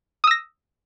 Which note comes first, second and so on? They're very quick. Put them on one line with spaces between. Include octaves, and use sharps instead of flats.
D#6 E6 A#6